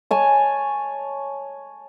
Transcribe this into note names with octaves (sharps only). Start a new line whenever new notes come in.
C#5 G#5 A5